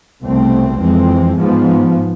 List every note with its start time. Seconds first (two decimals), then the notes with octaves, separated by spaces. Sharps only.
0.23 C2 B2 A3 C4
0.80 F2 E3 G#3 C4
1.38 G#2 F3 B3